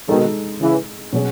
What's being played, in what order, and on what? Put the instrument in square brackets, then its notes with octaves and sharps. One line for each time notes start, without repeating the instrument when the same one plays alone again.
[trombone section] B2 D#3 [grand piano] G#3 D#4 A4
[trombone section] C#3 E3
[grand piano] B2 F#3 C#4 G#4